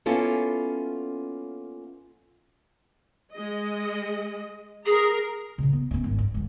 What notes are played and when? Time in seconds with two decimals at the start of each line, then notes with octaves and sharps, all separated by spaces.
0.06 A#3 B3 C#4 E4 F4 A4
3.33 G#3 D#5
4.86 G#4 A#4 A#5
5.58 A#2 C#3
5.73 B3
5.91 B3 C#4
6.04 G#1
6.18 F#2
6.34 G#2 D#3